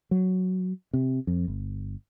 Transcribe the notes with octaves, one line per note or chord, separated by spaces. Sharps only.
F#3
C3
F2
G1